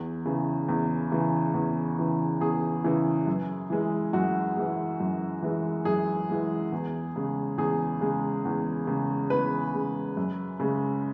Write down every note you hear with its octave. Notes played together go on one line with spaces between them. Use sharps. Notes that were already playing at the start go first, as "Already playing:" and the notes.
Already playing: E2
C#3 E3
E2
C#3 E3
E2
C#3 E3
E2 G#4
C#3 E3
F#2
E3 G#3
F#2 F#4
E3 G#3
F#2
E3 G#3
F#2 G#4
E3 G#3
E2
C#3 G#3
E2 G#4
C#3 G#3
E2
C#3 G#3
E2 B4
C#3 G#3
F#2
C#3 G#3